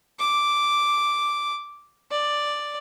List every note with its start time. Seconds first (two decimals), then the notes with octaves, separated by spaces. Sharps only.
0.19 D6
2.11 D5